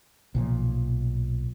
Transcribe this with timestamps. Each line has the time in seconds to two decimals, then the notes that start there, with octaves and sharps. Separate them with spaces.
0.35 B1 A#2 E3 F3